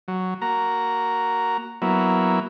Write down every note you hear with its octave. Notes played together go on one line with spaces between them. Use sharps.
F#3
A#3 F#4 A#5
F#3 A#3 B3 E4